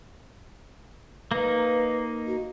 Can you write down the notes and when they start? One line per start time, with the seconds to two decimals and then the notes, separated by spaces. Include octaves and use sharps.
1.32 A#3 D#4 B4
2.27 F#4